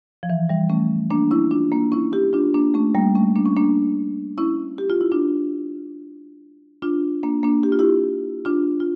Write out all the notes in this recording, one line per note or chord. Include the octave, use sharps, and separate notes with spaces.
F3
E3
E3 G3
A3 C#4
A#3 D4
C#4 E4
D4 F4
A#3 D4
C#4 E4
E4 G4
D4 F4
A#3 D4
A3 C#4
G3 A#3
A3 C#4
A#3 D4
C#4
A#3 D4
C#4 E4
G4
F4
E4
D4 F4
D4 F4
A#3 D4
A#3 D4
G4
F4
E4 G4
D4 F4
F4